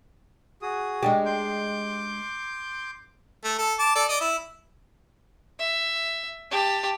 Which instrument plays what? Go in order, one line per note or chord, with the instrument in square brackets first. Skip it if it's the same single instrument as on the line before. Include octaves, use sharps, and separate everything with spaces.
[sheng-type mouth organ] F#4 G#4 D#6
[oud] G#3 D4 G4
[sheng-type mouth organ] C6 D6 G6
[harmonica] A3
A4
A5 D6
A4 D5
D5 D#5
E4
[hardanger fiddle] E5
G4 A5